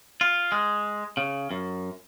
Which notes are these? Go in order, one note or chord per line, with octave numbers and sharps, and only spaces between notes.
F4
G#3
C#3
F#2